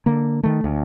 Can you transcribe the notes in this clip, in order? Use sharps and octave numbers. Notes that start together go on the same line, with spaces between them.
D3 A#3
D#3 A3
D2